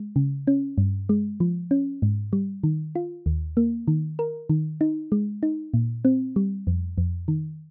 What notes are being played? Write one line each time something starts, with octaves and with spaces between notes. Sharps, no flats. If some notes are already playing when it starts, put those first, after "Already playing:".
Already playing: G#3
C#3
C#4
G2
G#3
F3
C#4
G#2
G3
D#3
F4
D#2
A#3
D#3
A#4
D#3
D#4
G#3
D#4
A#2
C4
G3
F2
F2
D#3